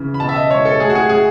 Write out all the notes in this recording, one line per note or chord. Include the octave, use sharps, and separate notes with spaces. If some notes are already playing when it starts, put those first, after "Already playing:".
Already playing: C#3 E3
B5
B2 A5
E5
D#5
G#3 C#5
A4
A2 G#4
F#4
G#4
A2 G#4